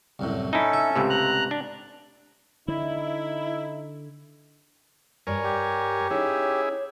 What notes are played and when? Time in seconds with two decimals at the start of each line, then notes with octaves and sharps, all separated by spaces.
0.19 C2 F#2 A2
0.53 C#4 D#4 E4 A4
0.73 E5
0.96 C#2 A2 C3
1.10 A#5 F#6
1.51 D4
2.68 D3 D#4 E4
5.27 G2 G3 A#4 C#5 G#5
5.44 G4
6.10 C#4 D#4 E4 G#4 C#5